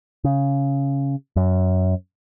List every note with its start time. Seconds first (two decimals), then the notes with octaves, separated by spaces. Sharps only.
0.24 C#3
1.36 F#2